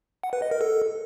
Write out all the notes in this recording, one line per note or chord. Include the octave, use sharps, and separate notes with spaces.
F#5
B4
D#5
A#4
A4